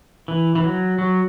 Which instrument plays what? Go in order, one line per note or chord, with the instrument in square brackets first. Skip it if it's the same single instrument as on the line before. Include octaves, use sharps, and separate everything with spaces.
[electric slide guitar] E3
E3
F#3
F#3